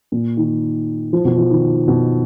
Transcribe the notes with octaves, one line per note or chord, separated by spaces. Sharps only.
A#2
D#3
F3
B2
F3
D#3
B2